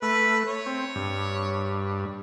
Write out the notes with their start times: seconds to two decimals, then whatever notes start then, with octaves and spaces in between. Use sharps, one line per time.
0.02 A3 B4
0.47 C#5
0.66 C4
0.95 G2